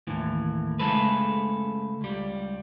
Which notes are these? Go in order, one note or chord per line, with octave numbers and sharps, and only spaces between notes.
D#2 A2 E3
C#3 G#3 A3 A4 B4
C#2 G3